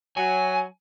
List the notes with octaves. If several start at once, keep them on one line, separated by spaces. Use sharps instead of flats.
F#3 G#5